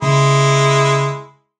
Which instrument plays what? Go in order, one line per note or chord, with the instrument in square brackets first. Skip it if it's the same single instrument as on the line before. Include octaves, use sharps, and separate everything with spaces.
[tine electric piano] C#3 [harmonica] G#3 E4